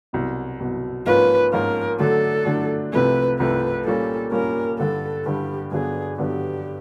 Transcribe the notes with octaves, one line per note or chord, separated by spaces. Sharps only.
C2 B2 F#3
C2 B2 F#3
G#2 F3 A#3 C#4 F4 B4
G#2 F3 A#3 C#4 F4 A#4
D3 F#3 A3 D4 A4
D3 F#3 A3 D4
C2 C3 F3 A3 B4
C2 C3 F3 A3 B4
A#2 G3 A#3 C#4 A4
A#2 G3 A#3 C#4 A#4
G2 D3 G3 A4
G2 D3 G3 G4
G2 D3 F#3 B3 D4 G#4
G2 D3 F#3 B3 D4 G4